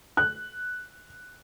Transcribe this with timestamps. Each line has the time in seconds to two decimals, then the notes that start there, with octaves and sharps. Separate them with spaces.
0.17 F#6